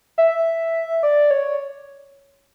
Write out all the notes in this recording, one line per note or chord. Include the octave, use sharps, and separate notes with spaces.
E5
D5
C#5